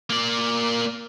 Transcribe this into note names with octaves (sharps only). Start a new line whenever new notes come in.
A#3 D5